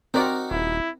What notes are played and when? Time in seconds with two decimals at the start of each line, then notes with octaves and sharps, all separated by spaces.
0.14 C4 D#4 F#4 A#4 D5
0.51 D#1 E4